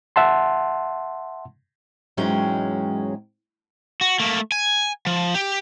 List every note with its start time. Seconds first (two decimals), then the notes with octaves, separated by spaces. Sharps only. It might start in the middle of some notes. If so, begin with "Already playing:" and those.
0.16 E5 F#5 A5 C6
2.17 E2 G#2 F#3 G#3 C#4 G5
4.01 F#4
4.20 A3 A#3
4.52 G#5
5.06 F3
5.35 G4